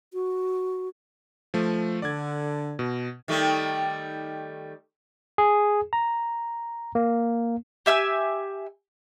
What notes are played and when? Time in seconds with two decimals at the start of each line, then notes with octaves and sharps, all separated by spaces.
0.14 F#4
1.54 F3 A3
2.02 D3 D5 G#6
2.79 B2
3.28 D#3 G3 A3
5.38 G#4
5.93 A#5
6.95 A#3
7.86 G4 E5 G#5 E6